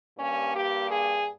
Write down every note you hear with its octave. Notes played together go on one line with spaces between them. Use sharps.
G2 G3 A#3 C#4
G4
G#4